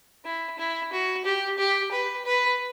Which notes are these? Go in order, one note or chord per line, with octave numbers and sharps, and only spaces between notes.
E4
E4
F#4
G4
G4
B4
B4